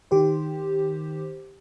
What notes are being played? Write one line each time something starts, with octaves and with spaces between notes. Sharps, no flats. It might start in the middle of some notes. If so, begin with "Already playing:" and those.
D#3 G4 C5